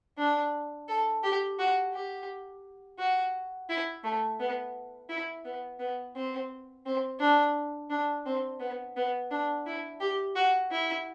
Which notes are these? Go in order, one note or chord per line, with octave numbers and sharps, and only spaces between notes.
D4
A4
G4
F#4
G4
F#4
E4
A3
B3
E4
B3
B3
C4
C4
D4
D4
C4
B3
B3
D4
E4
G4
F#4
E4